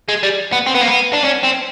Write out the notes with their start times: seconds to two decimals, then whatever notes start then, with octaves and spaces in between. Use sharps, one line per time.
0.09 G#3
0.23 G3
0.53 B3
0.67 C4
0.75 B3
0.81 A#3
0.88 B3
1.14 D4
1.25 C#4
1.44 C4